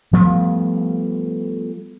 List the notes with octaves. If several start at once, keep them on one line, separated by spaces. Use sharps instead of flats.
F3 G3 A3 B3